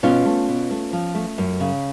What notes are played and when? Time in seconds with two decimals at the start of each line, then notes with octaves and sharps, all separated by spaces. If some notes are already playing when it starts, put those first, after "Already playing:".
0.03 B2 C#4 F4
0.26 A3
0.48 B2
0.71 A3
0.93 F3
1.15 A3
1.38 F#2
1.60 C#3